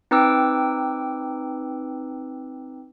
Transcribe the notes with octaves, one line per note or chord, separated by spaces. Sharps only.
C4 D#4 B4 G5 D6 E6